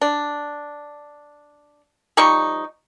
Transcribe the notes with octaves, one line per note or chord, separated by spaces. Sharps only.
D4
F3 G3 D#4 C#6